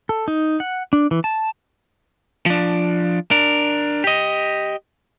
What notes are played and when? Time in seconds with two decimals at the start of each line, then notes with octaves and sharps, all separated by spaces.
0.09 A4
0.28 D#4
0.60 F#5
0.93 D4
1.11 E3
1.24 A5
2.46 F3 D4
3.31 D4 A#4
4.04 G4 D#5